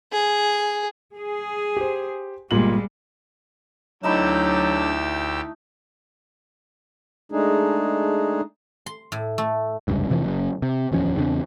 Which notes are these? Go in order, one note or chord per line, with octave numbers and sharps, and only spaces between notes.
G#4
G#4
G4 C5
G1 A#2 G3 G#3 F#7
D2 D3 F#3 A3 D#4 E4 G4 E6
G#3 A3 D4 D#4 G#4
C6
A2
A3
F1 C#2 G2
F1 C3 E3 F3
F#1 F#2
C3
D1 E2 F3 C#4
E2 C#3 C4 D4